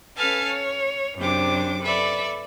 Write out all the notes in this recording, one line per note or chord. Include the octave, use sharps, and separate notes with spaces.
C#4 A4 B4 F5 G#5 A5
C#5
F#2 C3 D4 D6
A4 B4 D5 E5